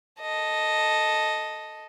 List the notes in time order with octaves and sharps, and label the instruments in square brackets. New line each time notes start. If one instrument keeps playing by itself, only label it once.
[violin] A4 D#5